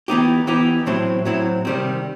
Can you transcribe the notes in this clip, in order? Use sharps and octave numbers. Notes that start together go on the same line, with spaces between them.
E3 B3 D#4 G4
E3 B3 D#4 G4
A2 F#3 C4 E4
A2 F#3 C4 E4
C3 D#3 G3 C4